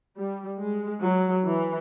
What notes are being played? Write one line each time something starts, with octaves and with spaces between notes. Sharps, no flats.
G3
G#3
F#3
E3